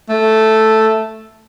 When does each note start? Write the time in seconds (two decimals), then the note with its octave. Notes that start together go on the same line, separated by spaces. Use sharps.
0.10 A3